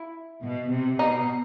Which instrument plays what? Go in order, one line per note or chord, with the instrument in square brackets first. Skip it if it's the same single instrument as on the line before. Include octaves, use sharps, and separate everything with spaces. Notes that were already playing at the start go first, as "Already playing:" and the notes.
Already playing: [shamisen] E4
[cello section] B2
C3
[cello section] B2 [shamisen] D#4